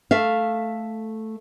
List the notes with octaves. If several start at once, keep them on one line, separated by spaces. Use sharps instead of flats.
A3 E5 F5